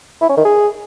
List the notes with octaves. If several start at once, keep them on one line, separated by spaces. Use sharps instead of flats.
E4
C#4
D#3
G#4